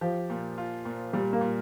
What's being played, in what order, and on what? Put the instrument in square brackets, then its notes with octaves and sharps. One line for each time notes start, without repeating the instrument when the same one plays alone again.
[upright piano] F3 [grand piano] G4
[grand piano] A#2
F4
A#2
[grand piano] A#2 [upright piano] G3
[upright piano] A#3
[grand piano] A#2